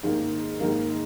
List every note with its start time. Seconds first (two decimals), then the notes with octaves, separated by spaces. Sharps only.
0.03 G#2 D#3 A#3
0.60 G#2 D#3 A#3